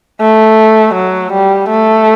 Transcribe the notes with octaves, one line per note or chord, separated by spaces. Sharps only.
A3
F#3
G3
A3